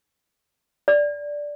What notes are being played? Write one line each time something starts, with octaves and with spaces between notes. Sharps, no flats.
D5